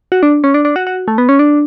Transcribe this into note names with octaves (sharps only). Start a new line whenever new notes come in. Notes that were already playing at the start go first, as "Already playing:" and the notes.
F#4
D4
C#4
D4
D4
F#4
F#4
A3
B3
C#4
D4